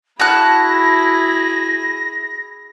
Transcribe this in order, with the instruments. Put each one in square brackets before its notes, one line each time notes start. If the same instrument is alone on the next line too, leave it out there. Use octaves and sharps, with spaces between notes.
[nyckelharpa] E4 G#4 [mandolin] F#4 A5 F#6 [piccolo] A#6